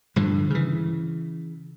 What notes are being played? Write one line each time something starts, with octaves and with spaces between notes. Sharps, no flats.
G2 D3 F3
C#3 E3